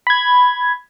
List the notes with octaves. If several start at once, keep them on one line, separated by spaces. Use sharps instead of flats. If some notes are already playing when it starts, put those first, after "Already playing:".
B5 G#6